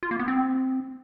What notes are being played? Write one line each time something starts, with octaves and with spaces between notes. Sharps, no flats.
F4
A#3
B3
C4